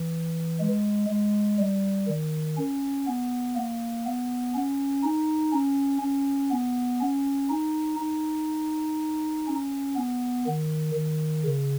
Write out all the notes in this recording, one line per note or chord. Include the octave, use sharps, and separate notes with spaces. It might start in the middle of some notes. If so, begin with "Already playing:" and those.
Already playing: E3
G#3
G#3
G3
D#3
C#4
B3
A#3
B3
C#4
D#4
C#4
C#4
B3
C#4
D#4
D#4
C#4
B3
D#3
D#3
C#3